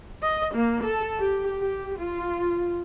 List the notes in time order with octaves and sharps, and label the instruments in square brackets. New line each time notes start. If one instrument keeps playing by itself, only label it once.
[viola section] D#5
A#3
A4
G4
G4
F4